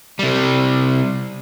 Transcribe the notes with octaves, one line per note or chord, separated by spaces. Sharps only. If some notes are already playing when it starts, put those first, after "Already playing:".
C3 G3